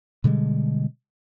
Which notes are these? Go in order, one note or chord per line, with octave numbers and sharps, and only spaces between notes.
B2 D3 G3 G#3